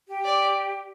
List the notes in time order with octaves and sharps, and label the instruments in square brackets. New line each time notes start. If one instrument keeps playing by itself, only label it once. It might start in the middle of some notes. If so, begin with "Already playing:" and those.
[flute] G4
[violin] D5